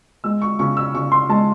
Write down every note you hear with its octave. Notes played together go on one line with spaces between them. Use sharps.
G#3 E6
C#6
C#3 C#6
E6
C#3 C#6
C6
G#3 A5